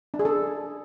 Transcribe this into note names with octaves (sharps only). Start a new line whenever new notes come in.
D4
G#4
A4